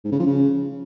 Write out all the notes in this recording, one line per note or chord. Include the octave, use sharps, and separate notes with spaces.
G#2
C#3
F3
C#3